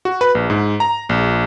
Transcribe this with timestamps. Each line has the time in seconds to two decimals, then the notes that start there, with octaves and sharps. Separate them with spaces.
0.05 F#4
0.21 B4
0.35 A#1
0.50 G#2
0.80 A#5
1.09 A#1